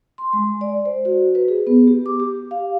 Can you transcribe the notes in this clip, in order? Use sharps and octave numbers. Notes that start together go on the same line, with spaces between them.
C6
G#3
D5
C5
F#4
B4
G#4
B3
G4
D6
G4
F5